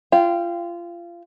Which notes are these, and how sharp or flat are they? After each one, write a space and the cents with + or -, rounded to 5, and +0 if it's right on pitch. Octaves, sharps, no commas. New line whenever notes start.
F4 -25 G5 +0